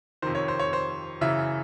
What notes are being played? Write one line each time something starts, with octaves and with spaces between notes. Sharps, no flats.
F2 C3 D#3 C5
C#5
C5
C#5
C5
F#2 C#3 E3 E5